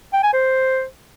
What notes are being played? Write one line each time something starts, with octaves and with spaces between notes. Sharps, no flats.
G5
G#5
C5